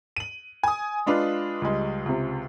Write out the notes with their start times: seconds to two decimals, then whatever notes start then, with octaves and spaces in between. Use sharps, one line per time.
0.16 D#7 F#7
0.63 G#5 D#6
1.06 G#3 D4 F4 B4
1.62 C#2 G3 G#3
2.06 C#2 C3